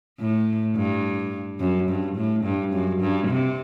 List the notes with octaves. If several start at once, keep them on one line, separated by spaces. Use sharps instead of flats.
A2
G2
F#2
G2
A2
G2
F#2
G2
C3